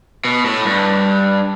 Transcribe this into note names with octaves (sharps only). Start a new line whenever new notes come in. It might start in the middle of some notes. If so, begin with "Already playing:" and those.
B2
A2
G2